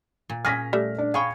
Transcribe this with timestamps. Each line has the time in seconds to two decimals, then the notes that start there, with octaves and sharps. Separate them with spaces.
0.30 A#2
0.45 A#2 C#4 G#4 F6 A#6 B6
0.73 G3 A3
0.98 D4
1.14 G#4 C#5 F5 G5 B5 C#6